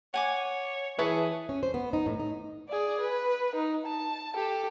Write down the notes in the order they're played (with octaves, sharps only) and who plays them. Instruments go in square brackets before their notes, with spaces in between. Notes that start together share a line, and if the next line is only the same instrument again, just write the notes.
[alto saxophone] C#5 [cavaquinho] F#5 G#5 D6
[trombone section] E3 [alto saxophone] G#4 [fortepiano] B4 [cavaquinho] C#5 E5 A5
[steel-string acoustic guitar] C#4
C5
B3
D#4
A2
D#4
[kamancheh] G#4 D5
B4
D#4
A5
G4 A4